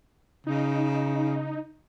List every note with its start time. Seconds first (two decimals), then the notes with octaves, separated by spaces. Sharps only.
0.47 C#3 D#4